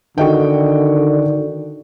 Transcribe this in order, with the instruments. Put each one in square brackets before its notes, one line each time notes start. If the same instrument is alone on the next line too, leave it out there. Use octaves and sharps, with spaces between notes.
[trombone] D3 [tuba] D#3 [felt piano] F#4 D#5 G5